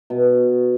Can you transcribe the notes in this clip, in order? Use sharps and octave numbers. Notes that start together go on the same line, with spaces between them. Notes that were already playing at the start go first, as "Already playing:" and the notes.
B2